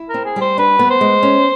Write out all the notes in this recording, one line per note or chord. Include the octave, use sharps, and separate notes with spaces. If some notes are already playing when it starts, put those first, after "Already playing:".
Already playing: E4
A#4
C4
G#4
G3 C5
D4 B4
B3
C5
G#3
C#4